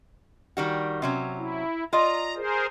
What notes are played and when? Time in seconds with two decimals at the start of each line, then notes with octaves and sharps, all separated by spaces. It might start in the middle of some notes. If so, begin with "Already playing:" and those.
0.57 D#3 G3 F#4
1.02 C3 F#3 C#4
1.37 E4
1.93 F4 D5 D#5 A#5
2.36 G#4 A#4 C5